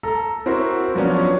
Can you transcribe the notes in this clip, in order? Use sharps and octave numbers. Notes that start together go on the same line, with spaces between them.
A4 A#5
C4 E4 F#4 A#4 C5
F3 F#3 B3 C#4 D4